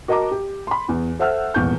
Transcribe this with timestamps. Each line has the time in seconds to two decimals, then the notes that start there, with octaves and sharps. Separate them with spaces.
0.08 F#4 A#4 D#5 A5 A#5 D6
0.31 G4
0.67 B5 C6
0.89 E2
1.19 A4 C5 E5 F#5 E6 F6
1.54 D#1 G#1 E2 C#6 G6